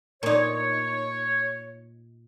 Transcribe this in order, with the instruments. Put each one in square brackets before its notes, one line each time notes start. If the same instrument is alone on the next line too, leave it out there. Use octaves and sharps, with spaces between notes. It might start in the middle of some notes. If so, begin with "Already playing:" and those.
[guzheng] A#2 D#4 [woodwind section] C#5